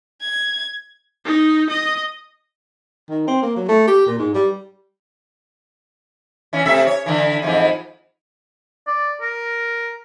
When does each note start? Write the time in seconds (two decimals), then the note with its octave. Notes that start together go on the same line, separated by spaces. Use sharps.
0.21 G#6
1.25 D#4
1.70 D#5
3.10 D#3
3.28 C4
3.42 A#3
3.56 F#3
3.69 A3
3.87 G4
4.07 A#2
4.19 G#2
4.35 G3
6.53 E3 C#4
6.66 C3 A3 E5
6.87 C#5
7.06 D3 E3
7.42 F2 G#2 E3
8.87 D5
9.21 A#4